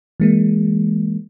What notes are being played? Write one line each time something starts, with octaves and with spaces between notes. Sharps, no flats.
E3 G#3 A#3